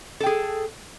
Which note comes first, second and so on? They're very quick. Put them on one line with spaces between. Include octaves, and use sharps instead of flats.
A4 G5 G#4